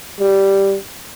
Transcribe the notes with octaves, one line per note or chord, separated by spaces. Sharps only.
G3